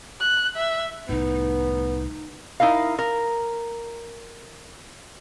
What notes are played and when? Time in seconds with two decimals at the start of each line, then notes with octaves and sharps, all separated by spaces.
0.20 F#6
0.56 E5
1.09 C2 A2 B3 D#4
2.60 D#4 E4 A#4 F5
2.99 A#4